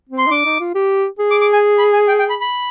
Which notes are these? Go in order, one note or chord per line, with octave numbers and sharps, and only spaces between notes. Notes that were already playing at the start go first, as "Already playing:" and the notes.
C4
C6
D#4
D4 D6
D#4
F4
G4
G#4
D6
D6
G#5
B5
G#5
G5
G5
B5
B5